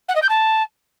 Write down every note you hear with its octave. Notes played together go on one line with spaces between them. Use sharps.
F#5
D#5
G6
A5